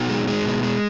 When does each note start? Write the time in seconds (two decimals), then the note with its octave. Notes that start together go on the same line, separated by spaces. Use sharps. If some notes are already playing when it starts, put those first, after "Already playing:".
Already playing: B2 D#4 F#4
0.10 G#3
0.28 G#3
0.45 B2
0.63 G#3